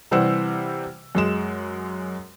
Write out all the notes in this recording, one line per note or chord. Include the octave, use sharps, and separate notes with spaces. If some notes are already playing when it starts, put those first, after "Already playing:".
C3 E3 G3 C5 F#5 E6
F#2 G#3 E7